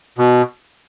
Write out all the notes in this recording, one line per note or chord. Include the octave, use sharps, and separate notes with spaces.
B2